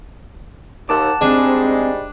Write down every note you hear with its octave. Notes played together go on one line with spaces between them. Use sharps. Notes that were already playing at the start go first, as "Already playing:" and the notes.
D#2 F#5 A5 D6
G#2 G3 G#3 C4 D4 G#5